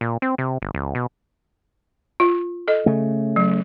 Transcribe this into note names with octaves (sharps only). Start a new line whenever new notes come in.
A#2
C4
C3
G1
C#2
B2
F4
A4 D#5
C#3 A3
F#3